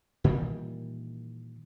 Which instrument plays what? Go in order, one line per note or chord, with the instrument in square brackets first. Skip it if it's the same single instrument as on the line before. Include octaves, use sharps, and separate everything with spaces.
[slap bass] A#2 D#3 E3 G3